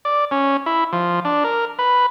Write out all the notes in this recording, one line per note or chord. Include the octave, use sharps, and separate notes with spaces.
D5
C#4
E4
F3
D4
A#4
B4